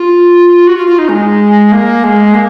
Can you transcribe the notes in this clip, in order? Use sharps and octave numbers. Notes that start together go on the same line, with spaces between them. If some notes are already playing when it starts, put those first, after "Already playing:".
Already playing: F4
F#4
F4
F4
D#4
G#3
A#3
G#3
A#3